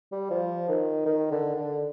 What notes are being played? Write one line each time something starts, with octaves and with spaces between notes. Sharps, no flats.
G3
F3
D#3
D#3
D3
D3